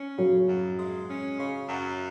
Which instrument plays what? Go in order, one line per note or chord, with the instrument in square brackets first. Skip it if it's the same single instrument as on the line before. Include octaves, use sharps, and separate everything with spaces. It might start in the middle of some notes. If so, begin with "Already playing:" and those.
Already playing: [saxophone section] C#4
[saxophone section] C#3 [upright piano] F#3
[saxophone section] F#2
G#3
C#4
C#3
F#2